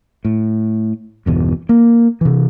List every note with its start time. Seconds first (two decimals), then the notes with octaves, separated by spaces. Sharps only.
0.25 A2
1.26 G1 E2 B2
1.69 A#3
2.21 C3 E3